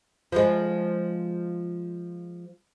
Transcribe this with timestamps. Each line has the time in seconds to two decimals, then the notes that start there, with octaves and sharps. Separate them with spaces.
0.32 F3 G#3